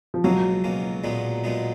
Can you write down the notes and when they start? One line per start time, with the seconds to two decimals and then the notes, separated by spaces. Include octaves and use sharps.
0.14 F3
0.24 C#2 B2 F#3 A#3 C#4
0.64 C#2 B2 A#3 C#4
1.04 B1 A#2 G#3 B3 D#4
1.44 B1 A#2 G#3 B3 D#4